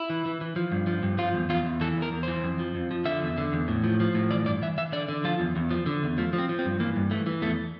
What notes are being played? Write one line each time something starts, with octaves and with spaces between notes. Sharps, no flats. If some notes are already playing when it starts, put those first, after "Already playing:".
Already playing: E4
E3
E3
E3
F3
G2
F3
G2
F3 F4
E2
E2 F4
E2
E3 A4
E2 A#4
E2
E3 C5
F2
F3
F2
F3
D3 E5
E2
D3
E2
A2
F3
F3
A2
E3 D5
G2 D5
E3 E5
E3 E5
D3 D5
D3
F3 F4
E2
E2
F3
D3
E2
F3 A3
F3
C4
F3
C4
G2
E3 A#3
G2
E3 A3
E3
E2 A3